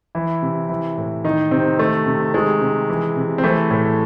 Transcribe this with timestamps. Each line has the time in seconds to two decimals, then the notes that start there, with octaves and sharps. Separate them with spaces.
0.15 E3 E4
0.43 C3
0.69 E3
0.98 A2
1.24 D#3 D#4
1.51 C3 C4
1.79 D#3 A3
2.06 C3
2.34 D#3 G#3
2.61 C3
2.89 E3
3.17 C3
3.38 C4
3.43 E3 A3
3.71 A2